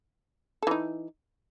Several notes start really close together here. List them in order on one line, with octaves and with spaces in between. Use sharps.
A4 E3 D#4